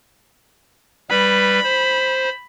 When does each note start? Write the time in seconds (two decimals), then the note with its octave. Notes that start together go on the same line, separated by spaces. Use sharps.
1.10 G3 B4 B5
1.64 C5